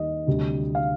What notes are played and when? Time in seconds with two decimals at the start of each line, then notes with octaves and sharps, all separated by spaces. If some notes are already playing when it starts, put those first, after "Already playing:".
Already playing: D#2 D#3 G3 D#5
0.27 D2 C3 G3
0.75 F5